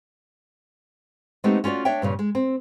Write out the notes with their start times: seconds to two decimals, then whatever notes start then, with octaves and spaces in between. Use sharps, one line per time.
1.44 G#3 A3 B3 C4 D#4 G4
1.64 C#4 F4 F#4 C#5 D5
1.85 D4 C#5 E5 G5
2.02 G2 A#2 C#3
2.19 G#3
2.35 C4